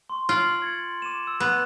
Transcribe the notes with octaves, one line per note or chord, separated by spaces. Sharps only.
C6 C#6
F4 D7 F#7
G#6 A6 C#7
D6 D#7 E7
E6
B3